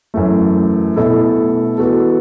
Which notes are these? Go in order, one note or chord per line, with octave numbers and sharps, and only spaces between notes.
F#2 E3 A3
B2 A3 E4 A4
E3 B3 F#4 A4